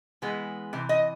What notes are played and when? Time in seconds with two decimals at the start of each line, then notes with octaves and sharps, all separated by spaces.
0.22 E3 G#3 B3
0.73 C3 E3
0.89 D#5